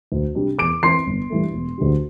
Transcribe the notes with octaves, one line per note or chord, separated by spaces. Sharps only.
D2
C3 G3 D4
E2 D6 D7
E3 C4 E4 C6 C7
G1
G2 E3 A3
E1
D2 D3 G3